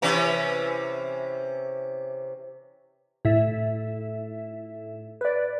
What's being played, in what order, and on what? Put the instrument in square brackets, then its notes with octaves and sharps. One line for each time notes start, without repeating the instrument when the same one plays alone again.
[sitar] C3 E3 C#4
[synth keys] A2 E5
B4 D5